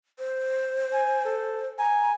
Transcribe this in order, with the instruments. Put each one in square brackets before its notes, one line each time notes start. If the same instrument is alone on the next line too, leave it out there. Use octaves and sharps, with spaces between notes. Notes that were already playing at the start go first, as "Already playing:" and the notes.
[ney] C5
[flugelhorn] G#5
A4
[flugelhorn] G#5 [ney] A#5